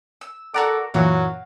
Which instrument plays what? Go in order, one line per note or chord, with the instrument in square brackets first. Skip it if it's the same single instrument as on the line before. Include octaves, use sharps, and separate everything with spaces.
[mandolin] E6
[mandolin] F#4 A#4 D6 [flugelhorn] A4 [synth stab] D5 F#5 A#5
[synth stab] F#2 A#2 E3 [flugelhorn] F#3 [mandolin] F#4 F5